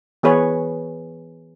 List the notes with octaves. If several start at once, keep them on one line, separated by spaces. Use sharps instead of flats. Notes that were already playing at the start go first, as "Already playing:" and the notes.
E3 B3 G#4 B4 C#5